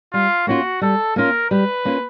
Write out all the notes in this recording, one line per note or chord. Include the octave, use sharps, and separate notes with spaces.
G3 F4
A#3 C#4 F4 F#4
G3 A4
A#3 C#4 F4 A#4
G3 B4
A#3 C#4 F4